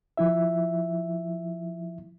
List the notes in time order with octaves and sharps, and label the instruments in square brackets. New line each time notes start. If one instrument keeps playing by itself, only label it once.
[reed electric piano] F3 E4 E5